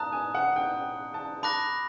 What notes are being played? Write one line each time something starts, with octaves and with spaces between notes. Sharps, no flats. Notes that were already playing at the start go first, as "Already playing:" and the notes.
Already playing: A5 A#5 D#6 F#6
G#5
F#5
G5
A5
A5 B5 D6 F#6 A#6